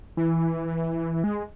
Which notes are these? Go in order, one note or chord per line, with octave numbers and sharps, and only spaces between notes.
E3
G#3